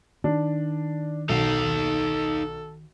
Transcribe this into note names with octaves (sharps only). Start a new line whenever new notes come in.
D#3 D4
B1 D#4 A4 F5